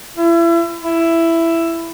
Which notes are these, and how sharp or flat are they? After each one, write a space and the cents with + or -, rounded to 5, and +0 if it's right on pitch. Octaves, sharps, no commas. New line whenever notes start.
E4 +35
E4 +10